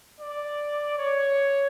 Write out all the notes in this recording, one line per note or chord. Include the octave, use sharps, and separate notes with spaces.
D5
C#5